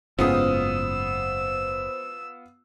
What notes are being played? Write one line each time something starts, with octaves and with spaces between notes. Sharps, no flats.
F#1 G#2 B3 C#4 F4 C5 D#6 E6